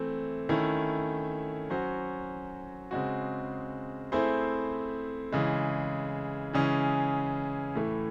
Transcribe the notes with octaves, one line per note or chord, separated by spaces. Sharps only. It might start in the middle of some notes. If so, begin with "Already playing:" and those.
Already playing: E3 A3 C4
D#3 A3 C#4 E4
F#3 C#4 F#4 C5
C#3 G#3 C4 F#4
A3 C4 E4 G#4 C5
C#3 E3 G#3
C#3 E3 G#3 C#4 G#4
A2 E3 A3